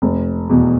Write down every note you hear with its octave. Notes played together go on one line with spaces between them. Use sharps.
F1
E2 B2